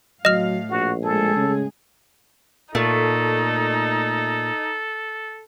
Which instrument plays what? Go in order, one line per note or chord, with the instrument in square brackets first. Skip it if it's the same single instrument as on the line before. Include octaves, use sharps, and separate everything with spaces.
[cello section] A2 F5 [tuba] F#3 [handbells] D#5 F6
[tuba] A#1 [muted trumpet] F#4
[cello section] A2 G#3 G#4 [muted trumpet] A4
[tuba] C#3
[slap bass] A#2 [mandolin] A3 [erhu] D#4 [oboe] A4